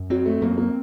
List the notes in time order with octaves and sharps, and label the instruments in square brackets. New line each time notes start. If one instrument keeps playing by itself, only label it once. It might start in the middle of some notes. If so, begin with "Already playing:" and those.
Already playing: [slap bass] F#2
[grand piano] F#3 [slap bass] C4
[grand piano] A3
[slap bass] F#2 [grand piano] A#3
[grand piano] A#3